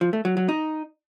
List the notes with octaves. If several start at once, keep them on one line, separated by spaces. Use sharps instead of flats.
F3
A3
F#3
F#3
D#4